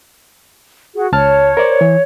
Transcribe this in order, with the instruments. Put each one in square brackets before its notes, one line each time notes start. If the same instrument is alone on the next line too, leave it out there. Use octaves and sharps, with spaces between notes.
[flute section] F#4 G#4
[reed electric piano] C#2 A5 F6 [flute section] C#5
[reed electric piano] A#4 C5 D5
E3